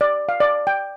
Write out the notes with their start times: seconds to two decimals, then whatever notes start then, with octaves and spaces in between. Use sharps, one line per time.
0.01 D5
0.29 F5
0.40 D5
0.67 G5